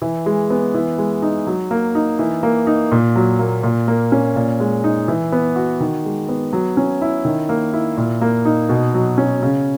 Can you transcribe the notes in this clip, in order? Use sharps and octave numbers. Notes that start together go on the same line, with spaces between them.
E3
G#3
B3
E3
G#3
D#4
F#3
A#3
D#4
E3
A#3
D#4
A#2
F#3
A#3
A#2
A#3
C#4
A#2
G#3
D#4
E3
B3
F#4
D#3
G#3
B3
F#3
C#4
E4
D#3
A#3
E4
A#2
A#3
D#4
B2
F#3
C#4
C#3